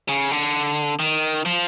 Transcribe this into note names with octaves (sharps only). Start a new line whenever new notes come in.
C#3
D3
D#3
F3